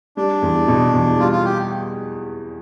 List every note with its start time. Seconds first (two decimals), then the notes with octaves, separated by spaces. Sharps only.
0.17 G3 D4
0.42 E2
0.68 B2
0.93 E2
1.19 G3 F4
1.32 F4
1.45 G4